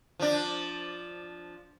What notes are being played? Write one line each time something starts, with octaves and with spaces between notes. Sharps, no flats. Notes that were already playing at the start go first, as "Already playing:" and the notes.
F3 D4